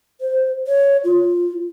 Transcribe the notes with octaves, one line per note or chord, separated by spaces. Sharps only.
C5
C#5
F4